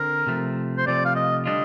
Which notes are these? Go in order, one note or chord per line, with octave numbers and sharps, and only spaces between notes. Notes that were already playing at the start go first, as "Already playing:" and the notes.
Already playing: D3 C4 A#4
C3 F3 A3
C5
C3 F3 A3 D5
F5
D#5
D3 G3 D4 F4 D#5